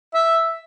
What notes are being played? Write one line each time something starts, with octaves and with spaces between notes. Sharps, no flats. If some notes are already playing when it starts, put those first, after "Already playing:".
E5